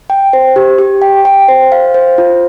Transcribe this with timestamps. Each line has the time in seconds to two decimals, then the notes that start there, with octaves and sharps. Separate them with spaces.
0.10 G5
0.33 C5
0.56 G4
0.78 G4
1.02 G5
1.25 G5
1.48 C5
1.72 F5
1.94 C5
2.18 F4